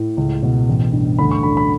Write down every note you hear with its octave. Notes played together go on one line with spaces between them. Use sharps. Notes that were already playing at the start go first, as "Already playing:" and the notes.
Already playing: A2
C#2
B2
A1
G2
D2 B5
C#6
D3 B5
B5